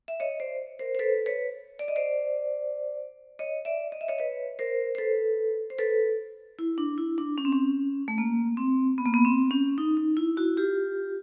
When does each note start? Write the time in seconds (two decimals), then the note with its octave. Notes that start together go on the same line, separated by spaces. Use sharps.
0.08 E5
0.20 C#5 D#5
0.40 C5 D5
0.79 A#4 C5
0.95 C5
0.99 A4 B4
1.26 B4 C#5
1.79 D5
1.88 D#5
1.96 C5 D5
3.39 C#5 D#5
3.65 D5 E5
3.92 D#5
4.01 E5
4.08 C#5 D#5
4.19 B4 C#5
4.59 A#4 C5
4.95 C5
4.98 A4 B4
5.70 C5
5.79 A4 B4
6.59 E4
6.78 D4
6.98 E4
7.18 D4
7.38 C#4
7.45 C4
7.52 C#4
8.08 A3
8.18 A#3
8.57 C4
8.98 B3
9.06 A#3
9.14 B3
9.25 C4
9.51 C#4
9.78 D#4
9.97 D#4
10.17 E4
10.37 E4 F#4
10.57 F4 G4